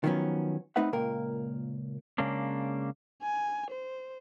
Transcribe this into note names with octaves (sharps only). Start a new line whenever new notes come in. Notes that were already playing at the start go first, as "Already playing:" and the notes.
D#3 F3 F#3 B3 C#4
A3 C4 D#4 B4 E5 F#5
C#2 A#2 A#3 A#4 G5
C#3 G#3 A#3 C#4 D4
G#5
C5